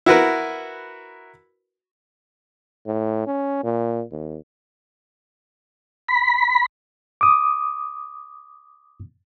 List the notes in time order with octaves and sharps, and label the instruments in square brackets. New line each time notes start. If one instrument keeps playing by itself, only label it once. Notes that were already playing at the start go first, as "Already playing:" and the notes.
[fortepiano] E4 F#4 A#4 B4
[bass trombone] A2
C#4
A#2
D#2
[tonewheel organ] B5
[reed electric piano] D6 D#6